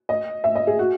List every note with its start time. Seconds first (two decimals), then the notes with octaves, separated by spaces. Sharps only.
0.09 D#5
0.44 E5
0.55 D#5
0.67 G#4
0.79 F#4